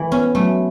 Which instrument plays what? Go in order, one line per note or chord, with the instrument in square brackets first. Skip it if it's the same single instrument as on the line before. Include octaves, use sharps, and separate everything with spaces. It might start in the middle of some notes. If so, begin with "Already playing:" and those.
Already playing: [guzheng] E3 A3
[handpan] B3 [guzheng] C#4
[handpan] F#3 [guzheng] A3